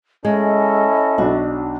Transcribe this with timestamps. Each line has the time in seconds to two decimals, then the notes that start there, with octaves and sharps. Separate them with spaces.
0.25 G#3 C#4 E4 A4 D#5
1.18 B1 F#3 D4 F#4